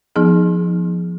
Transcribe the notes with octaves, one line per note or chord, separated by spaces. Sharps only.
F3 B3 D#4 G#4